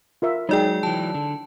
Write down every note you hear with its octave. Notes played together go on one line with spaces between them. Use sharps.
F4 A#4 E5
F#3 G#3 D#4 G#4 D5 G5
E3 F#3 A5
D3